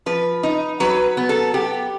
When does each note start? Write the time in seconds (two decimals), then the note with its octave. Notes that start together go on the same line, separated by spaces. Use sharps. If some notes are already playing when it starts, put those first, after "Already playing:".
0.06 F3 B4
0.43 D#4
0.80 F#3 B4
1.17 B3
1.29 A4
1.54 B3 G4